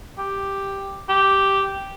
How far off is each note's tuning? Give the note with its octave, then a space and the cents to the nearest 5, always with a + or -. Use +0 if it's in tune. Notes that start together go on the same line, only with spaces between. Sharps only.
G4 +5
G4 -5